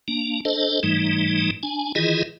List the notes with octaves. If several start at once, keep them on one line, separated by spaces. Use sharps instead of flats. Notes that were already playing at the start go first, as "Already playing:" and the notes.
A#3 D4
D4 A4 C5 D#5
G#2 E3 G3 A3 D#4
D4 G#5
D#3 E3 E4 F4 G#4 D#5